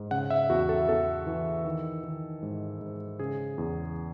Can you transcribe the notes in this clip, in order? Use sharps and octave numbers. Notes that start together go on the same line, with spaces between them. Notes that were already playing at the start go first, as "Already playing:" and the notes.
Already playing: G#2
C#3 F#5
E5
E2 F#4
A4
E2 A4
E3
D#3
D#3
G#2
G#2
C#3 G#4
E2